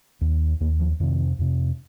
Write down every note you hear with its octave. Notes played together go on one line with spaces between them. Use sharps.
D#2
D#2 A#3
F3
F2 C3 D#3
F2 C3